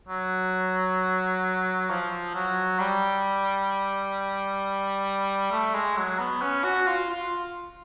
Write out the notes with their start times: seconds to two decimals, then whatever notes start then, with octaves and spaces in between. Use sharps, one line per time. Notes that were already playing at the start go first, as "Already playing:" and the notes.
0.08 F#3
1.90 F3
2.34 F#3
2.80 G3
5.52 A3
5.74 G#3
5.96 F#3
6.19 B3
6.42 C#4
6.64 F#4
6.87 F4
7.09 F4